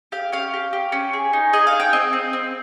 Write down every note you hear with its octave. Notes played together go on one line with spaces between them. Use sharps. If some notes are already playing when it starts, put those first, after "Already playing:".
G4 F5
C#4 F5
G4
G4
C#4
G#4
D#4
G#4 D#5
F5
G#4
G5
C4 D#5
C4
C4